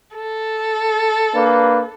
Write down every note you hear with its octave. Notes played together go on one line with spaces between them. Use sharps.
A4
A#3 D4 B4